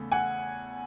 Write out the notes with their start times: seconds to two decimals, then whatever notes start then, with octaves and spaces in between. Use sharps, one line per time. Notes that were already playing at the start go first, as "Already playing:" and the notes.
Already playing: E2 C#3 A3
0.12 F#5 G#5